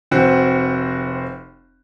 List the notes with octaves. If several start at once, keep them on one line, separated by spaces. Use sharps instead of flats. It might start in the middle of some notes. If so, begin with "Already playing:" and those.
F1 C4 F#4